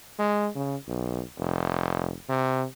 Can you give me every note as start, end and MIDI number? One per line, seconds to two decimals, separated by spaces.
0.19 0.48 56
0.55 0.76 49
0.87 1.21 35
1.38 2.13 29
2.29 2.65 48